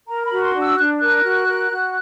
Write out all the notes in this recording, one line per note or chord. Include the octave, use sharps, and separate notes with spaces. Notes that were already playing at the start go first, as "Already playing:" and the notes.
A#4 A#5
B5
F#4
C6
D4
E6
D4 F#6
A#4 F#6
F#4
A#4
F#4